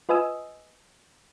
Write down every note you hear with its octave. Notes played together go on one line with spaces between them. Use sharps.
F4 B4 D#5 G#5 D#6 E6